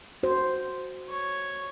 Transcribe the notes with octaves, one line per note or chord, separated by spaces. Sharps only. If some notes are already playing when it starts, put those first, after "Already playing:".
F#4 C5
C#5